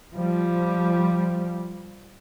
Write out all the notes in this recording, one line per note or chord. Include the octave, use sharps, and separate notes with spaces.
F3 G3